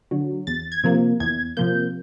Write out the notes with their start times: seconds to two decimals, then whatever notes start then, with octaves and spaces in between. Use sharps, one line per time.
0.11 D3 F#3
0.47 E2 A6
0.72 G#6
0.84 C3 F3 A#3
1.20 E2 G#6
1.57 C3 F3 A#3 G6